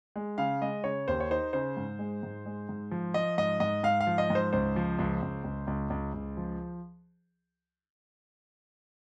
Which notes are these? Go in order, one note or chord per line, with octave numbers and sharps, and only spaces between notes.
G#3
C#3 F5
G#3 D#5
C#3 C#5
D#2 C5
C#5
D#4 C5
C#3 C5
G#2
G#3
G#2
G#3
G#2
F3
F3 D#5
G#2 D#5
G#2 D#5
G#2 F5
F5
F3
D#5
G#2
C5
C#2 C5
F3
C#2
C#2
C#2
C#2
C#2
C#2
F3